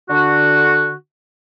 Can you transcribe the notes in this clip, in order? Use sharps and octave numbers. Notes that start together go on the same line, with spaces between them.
D3 F#4